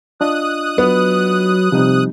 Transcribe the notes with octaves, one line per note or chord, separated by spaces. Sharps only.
D4 F4 D#5 D#6 F#6
F#3 B3
C3 F3 G3 D#4